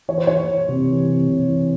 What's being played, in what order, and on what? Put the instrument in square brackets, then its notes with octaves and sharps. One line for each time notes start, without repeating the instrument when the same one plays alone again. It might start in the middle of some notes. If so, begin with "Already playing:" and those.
[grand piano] E3 C#5
C5
E3 C#5
E3
C3
E3
C3
C3
E3